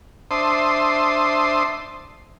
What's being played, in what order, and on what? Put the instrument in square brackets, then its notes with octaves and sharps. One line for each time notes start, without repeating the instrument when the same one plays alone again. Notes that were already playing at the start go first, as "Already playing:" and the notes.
[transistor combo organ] D4 C5 E5 A5 C6 D#6